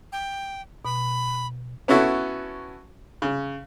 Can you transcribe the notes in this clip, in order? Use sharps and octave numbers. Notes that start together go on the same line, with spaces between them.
G5
B2 B5
B3 C#4 E4 F#4 A4
C#3